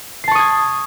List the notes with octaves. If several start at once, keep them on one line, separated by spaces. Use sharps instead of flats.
A5 C#6 D#6 G#6 C7